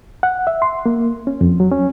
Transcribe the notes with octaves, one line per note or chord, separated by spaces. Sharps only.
F#5
E5
C6
A#3
C#4
F2
F#3
C#4